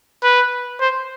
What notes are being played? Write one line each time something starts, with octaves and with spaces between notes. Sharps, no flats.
B4
C5